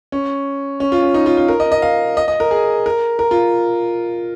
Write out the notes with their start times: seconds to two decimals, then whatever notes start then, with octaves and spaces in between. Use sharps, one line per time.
0.12 C#4
0.80 C#4
0.92 F4
1.03 C#4
1.14 D#4
1.26 F4
1.37 F4
1.48 A#4
1.60 D#5
1.72 D#5
1.82 F5
2.17 D#5
2.28 D#5
2.40 A#4
2.51 G#4
2.86 A#4
3.19 A#4
3.31 F4